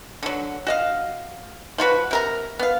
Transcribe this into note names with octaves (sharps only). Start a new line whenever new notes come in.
D3 F#3
F#4 D#5 F5
F3 F4 F#4 B4
C3 A#4 A#5
B3 F5